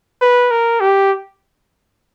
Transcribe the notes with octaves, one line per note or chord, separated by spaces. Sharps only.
B4
A#4
G4